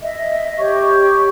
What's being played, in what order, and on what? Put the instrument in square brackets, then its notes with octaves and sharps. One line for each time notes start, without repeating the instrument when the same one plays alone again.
[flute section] D#5 E5
G4 C#5 C#6